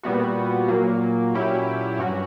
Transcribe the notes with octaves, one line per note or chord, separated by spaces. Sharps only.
A#2 G3 B3 F#4
A#2 F#3 A#3
A#2 F#3 C#4 E4 G4
G2 F#3 C#4 F#4